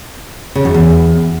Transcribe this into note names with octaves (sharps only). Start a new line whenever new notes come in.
C#3
F#2
E2